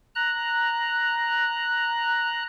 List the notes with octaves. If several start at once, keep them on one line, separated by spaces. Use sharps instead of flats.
A#5 F#6